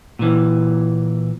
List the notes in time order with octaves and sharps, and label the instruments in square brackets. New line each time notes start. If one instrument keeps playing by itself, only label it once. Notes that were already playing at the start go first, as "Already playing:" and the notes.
[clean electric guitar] A#2 E3